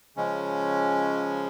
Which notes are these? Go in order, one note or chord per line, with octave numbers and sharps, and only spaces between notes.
C#3 F3 G#3 C#4